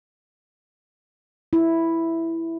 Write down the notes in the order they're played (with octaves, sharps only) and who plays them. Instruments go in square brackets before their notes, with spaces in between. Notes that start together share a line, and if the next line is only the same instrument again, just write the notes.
[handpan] E4